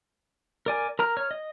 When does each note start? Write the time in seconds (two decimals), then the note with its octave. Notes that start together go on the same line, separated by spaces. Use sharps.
0.66 A#4 D5 G#5
0.99 A#4 A#5 F6
1.17 C#5 F6
1.31 D#5